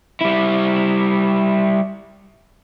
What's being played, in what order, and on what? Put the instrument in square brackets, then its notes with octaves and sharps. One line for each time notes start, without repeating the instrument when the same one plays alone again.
[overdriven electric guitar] G3 E4